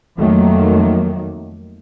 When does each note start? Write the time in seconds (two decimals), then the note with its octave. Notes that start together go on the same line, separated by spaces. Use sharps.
0.18 F2 D#3 F#3 A3 A#3